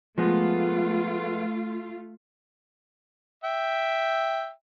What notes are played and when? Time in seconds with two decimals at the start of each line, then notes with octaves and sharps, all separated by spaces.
0.18 F3 G#3 A3 B3 F4
3.44 E5 G5